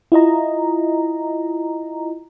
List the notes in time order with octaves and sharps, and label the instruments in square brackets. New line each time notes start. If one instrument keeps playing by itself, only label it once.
[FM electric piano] E4 F4 D#5 A#5